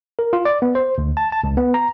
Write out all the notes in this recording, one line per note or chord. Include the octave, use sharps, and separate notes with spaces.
A#4
F4
D5
B3
C5
D2
A5
A5
C#2
B3
A#5